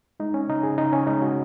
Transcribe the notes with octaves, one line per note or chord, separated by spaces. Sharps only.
G#3 D#4
C#4
C#3 D#4
G#4
C#3 D#4
C#4
G#3 D#4
F#4